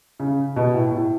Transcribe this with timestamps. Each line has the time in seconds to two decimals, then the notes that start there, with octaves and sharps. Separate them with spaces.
0.20 C#3
0.56 B2
0.74 A2
0.92 A2